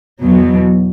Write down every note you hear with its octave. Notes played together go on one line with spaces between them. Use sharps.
E2 B2 F#3